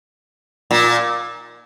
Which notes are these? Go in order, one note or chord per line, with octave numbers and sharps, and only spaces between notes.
A#2